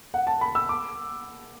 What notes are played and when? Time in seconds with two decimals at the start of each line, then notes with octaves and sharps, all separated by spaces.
0.14 F#5
0.27 A5
0.41 B5
0.55 E6
0.69 D6